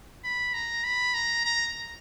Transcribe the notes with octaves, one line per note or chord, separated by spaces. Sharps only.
B5
A#5
B5
A#5
A#5